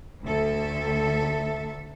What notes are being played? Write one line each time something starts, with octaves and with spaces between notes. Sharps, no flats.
D2 A4 E5